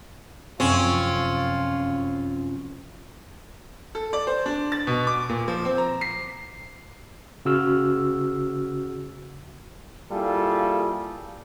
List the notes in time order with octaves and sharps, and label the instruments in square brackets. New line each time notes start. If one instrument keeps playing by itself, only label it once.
[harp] F1 F#2 [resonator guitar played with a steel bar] C4 [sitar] C#4 [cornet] F4
[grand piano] A4
D5
C5
D4
A6
B2
D6
A#2
F3
C4
A#5
C7
[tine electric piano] C#3 F#4 E6 F6
[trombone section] G3 A#3 E4 F4 G#4 A4